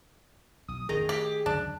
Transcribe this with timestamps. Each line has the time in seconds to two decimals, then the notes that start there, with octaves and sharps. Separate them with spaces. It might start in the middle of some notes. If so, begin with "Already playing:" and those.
0.68 B1 D#6
0.89 A1 F2 D#3 G#4 D#5 A#5
1.09 A3 G4
1.46 C#2 F#2 D3 D4